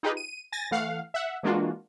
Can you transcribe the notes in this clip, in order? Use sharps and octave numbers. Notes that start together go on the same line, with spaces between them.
D#4 F4 G4 G#4 B4 D#5
D#7
G#5 A6 A#6
E3 A3 F5 F#5
E5 F#5
E3 G#3 A#3 D4 F4 F#4